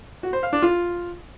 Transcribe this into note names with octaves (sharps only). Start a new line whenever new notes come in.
F#4
C5
F5
D4
F4